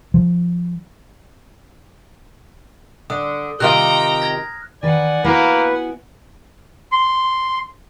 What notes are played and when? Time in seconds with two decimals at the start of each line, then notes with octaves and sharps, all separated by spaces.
0.14 F3
3.10 D3 D#6
3.60 C3 D#3 F4 G5 A#5 F6 F#6
4.22 G#6 A#6
4.83 D#3 B4 D5 F#5 G#5
5.24 A#3 B3 E4 F#4 B4
6.92 C6